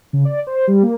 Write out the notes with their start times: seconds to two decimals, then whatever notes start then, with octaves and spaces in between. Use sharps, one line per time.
0.13 C#3
0.25 D5
0.47 C5
0.67 G3
0.83 A#3